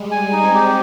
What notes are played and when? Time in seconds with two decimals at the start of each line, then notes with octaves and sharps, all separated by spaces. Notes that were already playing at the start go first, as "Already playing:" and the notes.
Already playing: G3 G#3
0.11 G#3 G#5
0.32 D#4
0.43 C4
0.54 G4